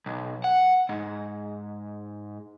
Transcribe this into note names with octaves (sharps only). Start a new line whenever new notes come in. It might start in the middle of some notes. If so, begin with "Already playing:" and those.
B1
F#5
G#2